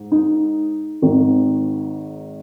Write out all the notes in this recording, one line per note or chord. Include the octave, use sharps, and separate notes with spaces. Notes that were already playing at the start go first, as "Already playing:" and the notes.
Already playing: G#2
D#4
G#1 G#2 D#3